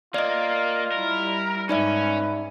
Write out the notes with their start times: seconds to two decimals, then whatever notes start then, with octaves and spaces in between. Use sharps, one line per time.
0.14 A#3 F4 D5 D#5
0.92 G3 E4 A#4
1.69 G#2 C#4 D#4 B4 D5 E5